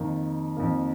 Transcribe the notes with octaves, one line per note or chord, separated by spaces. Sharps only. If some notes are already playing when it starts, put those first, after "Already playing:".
Already playing: F2 D#3 A#3
F2 D#3 A#3